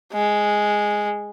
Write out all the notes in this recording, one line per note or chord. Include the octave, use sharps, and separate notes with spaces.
G#3